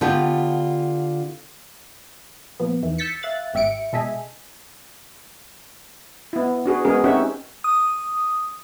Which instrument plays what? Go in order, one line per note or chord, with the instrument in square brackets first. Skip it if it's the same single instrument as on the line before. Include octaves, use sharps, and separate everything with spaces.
[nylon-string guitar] D3 B3 F4 G4 A5
[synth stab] A#2 F3 B3
E2 D#3 E3
E6 G6 A6 B6 C#7
E5 F5 F#6 A6
G#1 G4 E5 C#7 D7
B2 G#3 A4 D#5 E5 G#5
[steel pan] B3 E4
D4 F#4 G#4 B4
G#3 B3 C#4 G#4 A#4
C4 C#4 D#4 G4 E5 F#5
[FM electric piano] D#6